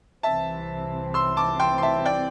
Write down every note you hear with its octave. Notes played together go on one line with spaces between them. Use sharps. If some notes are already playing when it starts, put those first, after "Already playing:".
C2 C3 E3 C4 E5 A5
C6 E6
A5 D6
G5 C6
C6
E5 A5
D5 G5